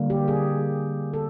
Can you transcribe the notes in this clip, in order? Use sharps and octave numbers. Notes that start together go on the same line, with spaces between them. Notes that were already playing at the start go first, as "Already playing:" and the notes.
Already playing: D3 G3 A#3
G4
G#4
A4